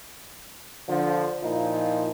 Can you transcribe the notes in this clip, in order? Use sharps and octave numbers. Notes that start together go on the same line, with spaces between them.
D3 F3
A#2 F3 D#4 E4